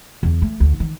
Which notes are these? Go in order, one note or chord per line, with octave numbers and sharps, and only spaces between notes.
E2
A3
D2
D#3